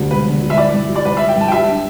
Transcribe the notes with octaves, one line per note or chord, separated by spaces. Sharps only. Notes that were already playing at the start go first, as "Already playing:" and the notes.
Already playing: D2 D3 G3
E1 B4
D3
G3
E5
E4 D5
G2
G3
D5
G2 B4
E4 E5
G5
G2 A5
G5
G3 E5
D4